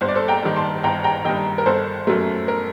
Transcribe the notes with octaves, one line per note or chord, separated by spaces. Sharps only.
G1 C5
D5
A4 C5
G5 A#5
G2 D#3
A5 C6
G1 G5 A#5
G5 A#5
G2 D#3 D#5 G5
A#4
G1 A4 C5
F#2 F#3 A3 A#4
A#4